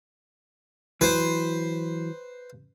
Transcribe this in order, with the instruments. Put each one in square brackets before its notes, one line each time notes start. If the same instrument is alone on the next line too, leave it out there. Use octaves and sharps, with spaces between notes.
[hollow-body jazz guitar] E3 F#3 [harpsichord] B4 C5